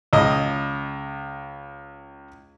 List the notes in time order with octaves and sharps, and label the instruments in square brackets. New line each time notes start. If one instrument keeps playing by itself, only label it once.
[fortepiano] C#2 D#5